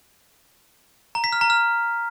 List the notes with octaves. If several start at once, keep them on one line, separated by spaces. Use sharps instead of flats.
A#5
B6
F6
A#5
F6